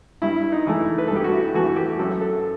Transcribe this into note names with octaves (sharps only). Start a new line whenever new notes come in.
G2 E4
D#4
E3 A3
B4
G2 A4
G4
F#4
E4
E3 A3 F#4
G4
F#2 A4
A4